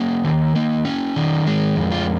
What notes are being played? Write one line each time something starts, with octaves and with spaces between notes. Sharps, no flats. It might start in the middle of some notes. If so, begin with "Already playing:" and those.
Already playing: A#3 C#4
D#3
A#3
C#4
D#3
G#3
F2
F4